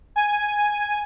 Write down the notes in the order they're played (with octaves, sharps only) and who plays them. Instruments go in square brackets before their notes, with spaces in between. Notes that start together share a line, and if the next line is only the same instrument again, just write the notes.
[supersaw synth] G#5